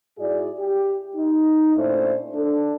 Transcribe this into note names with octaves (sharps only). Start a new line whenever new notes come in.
G#2 E4 F#4 G#4 D5
G4
D#4
A#2 A3 C#4 D4 E4 C5
D4 A4